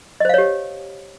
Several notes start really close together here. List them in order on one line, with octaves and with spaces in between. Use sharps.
D#5 C5 F5 C#5 G4